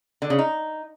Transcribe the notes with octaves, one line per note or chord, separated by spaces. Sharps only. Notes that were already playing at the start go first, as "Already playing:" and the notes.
D3
C#3
D#4